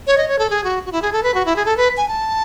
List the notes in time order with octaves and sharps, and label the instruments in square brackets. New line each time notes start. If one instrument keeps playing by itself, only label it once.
[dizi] C#5
D#5
C#5
A4
G#4
F#4
F#4
E4
G#4
A4
B4
F#4
E4
G#4
A4
B4
G#5
A5